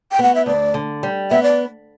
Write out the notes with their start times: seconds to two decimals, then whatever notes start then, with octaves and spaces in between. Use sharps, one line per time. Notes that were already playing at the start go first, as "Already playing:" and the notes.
0.12 G5
0.19 B3 F#5
0.35 E5
0.46 D2 D5
0.74 D3
1.03 G3
1.30 B3 E5
1.43 D5